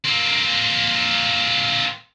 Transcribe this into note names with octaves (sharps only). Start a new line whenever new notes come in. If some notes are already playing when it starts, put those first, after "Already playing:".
A#3 C4